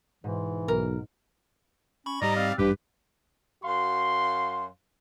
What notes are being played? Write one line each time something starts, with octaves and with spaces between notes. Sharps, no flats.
G#2 B2 E3
B1 A#4
C#4 B5 C#6
G#2 G3 G4 D5 D#5 A#5
C4 D5 F5
A1 G2 G4 B4
F#2 F#4 F5 C6